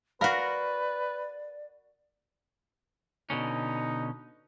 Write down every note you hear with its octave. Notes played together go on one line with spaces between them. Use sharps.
F#4 A#4 B4 D5 F5 B5
B2 D3 C#4 D#4